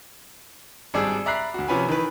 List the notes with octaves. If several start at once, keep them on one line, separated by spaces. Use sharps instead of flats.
G#1 G3 D4 G#4 E6
D5 E5 A#5 B5 F#6 C7
D2 F#4
C3 F3 C#4 B4 G#5 B5
D#3 E3 B4